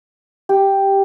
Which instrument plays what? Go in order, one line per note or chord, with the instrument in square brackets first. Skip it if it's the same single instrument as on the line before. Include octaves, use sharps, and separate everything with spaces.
[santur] G4